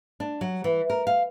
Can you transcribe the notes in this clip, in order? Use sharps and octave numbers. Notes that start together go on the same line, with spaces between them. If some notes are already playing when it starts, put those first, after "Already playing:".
D4
F#3
E3
A#4
F5